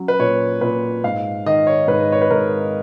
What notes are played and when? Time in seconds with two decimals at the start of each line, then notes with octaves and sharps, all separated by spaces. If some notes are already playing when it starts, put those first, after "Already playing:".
Already playing: F#3 C#4
0.08 B4
0.19 A#2 C#5
0.61 A#2 B4
1.04 G#2 F5
1.46 D#3 D#5
1.67 C#5
1.87 G#2 B4
2.12 C#5
2.22 B4
2.30 G#2 A#4